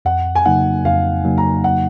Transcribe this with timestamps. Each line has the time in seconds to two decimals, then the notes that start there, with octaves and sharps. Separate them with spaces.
0.05 F2 F#5
0.35 G#5
0.45 C#3 F#3 A#3 D#4 F#5
0.85 F2 F5
1.25 C#3 F#3 A#3 D#4
1.38 A#5
1.64 F#5